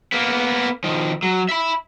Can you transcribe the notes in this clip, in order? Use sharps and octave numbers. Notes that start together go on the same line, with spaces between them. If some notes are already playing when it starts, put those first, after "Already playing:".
A#3 B3
D#3 F3
F#3
E5 B5